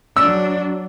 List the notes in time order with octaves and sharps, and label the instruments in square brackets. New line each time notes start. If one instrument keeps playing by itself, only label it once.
[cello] F#3 D4 [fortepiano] E6